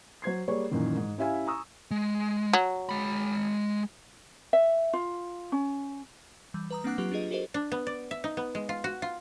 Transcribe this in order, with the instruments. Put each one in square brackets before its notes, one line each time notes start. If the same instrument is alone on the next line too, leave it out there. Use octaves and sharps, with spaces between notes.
[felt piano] F#3 C5 G#6 C7
G3 A#3 G#4 C#5 D5
F#2 A#2 D#3 E3
G#2
C#4 E4 G4 E5 F5 G#5
G#5 A#5 C#6 D#6 E6
[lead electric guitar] G#3
[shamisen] F#3
[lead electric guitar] G#3 B5
[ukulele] E5
F4
C#4
[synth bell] E3 G3
B4 A#5 D#6
A#3 C4 D4 F#5 D6 F#6
F#3 F4 G4 B4
D4 F4 G#4 D#5
F#4 G4 A4 A#4 C5 D#5
[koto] D4
B3
D5
E5
D#4
B3
G#3
F4
F#4
F4